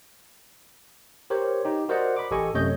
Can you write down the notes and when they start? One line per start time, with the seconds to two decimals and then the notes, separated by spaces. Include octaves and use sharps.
1.30 G4 A#4 C5 C#5
1.65 D#4 G4
1.89 F#4 A#4 C5 D5 D#5 F#5
2.16 B5 D6
2.31 A1 G4 A4 D#5 G#5 C#6
2.54 F#2 C3 A3 C#5 D#5 G6